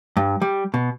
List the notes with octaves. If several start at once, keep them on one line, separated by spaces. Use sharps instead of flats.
G2
G3
B2